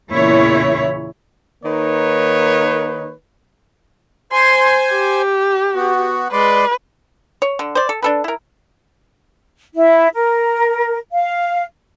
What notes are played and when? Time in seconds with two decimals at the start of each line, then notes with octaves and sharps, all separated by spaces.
0.11 E2 A#2 C#3 E4 C#5
1.64 D#3 A#3 D#4 B4 C#5
4.32 C5 G#5 C6
4.92 G4
5.75 B3 F#4
6.33 G#3 B4 D5 C6
7.42 C#5
7.59 D3
7.75 C5 D5
7.89 A4
8.02 D4 A4 B4
8.24 E4 A#4
9.75 E4
10.14 A#4
11.13 F5